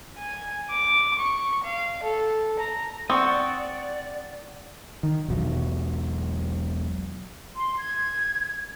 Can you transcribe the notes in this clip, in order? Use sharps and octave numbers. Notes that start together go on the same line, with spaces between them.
G#5
D6
C#6
F5
A4
A#5
C4 D5 F#5 C#6 D#6
D#3
E1 B1 F#3
C6
G#6